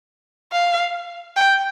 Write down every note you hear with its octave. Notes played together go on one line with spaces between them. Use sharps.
F5
G5